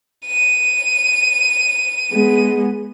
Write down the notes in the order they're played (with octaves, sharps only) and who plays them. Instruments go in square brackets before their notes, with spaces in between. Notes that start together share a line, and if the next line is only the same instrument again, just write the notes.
[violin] D#7
[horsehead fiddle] G#3 B3